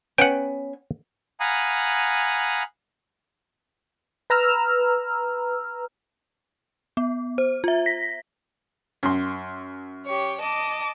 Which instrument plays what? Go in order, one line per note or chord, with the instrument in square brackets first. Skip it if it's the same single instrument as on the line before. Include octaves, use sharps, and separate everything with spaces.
[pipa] B3 C#4 [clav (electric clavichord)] F#5 G5
[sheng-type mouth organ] F5 F#5 G#5 A#5 B5 D#6
[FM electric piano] B4 A#5 E6 F6
[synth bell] B3
C5
F4 E5
A#6 B6
[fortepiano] F#2 C6
[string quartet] G4 C#5
D#5 A5 D6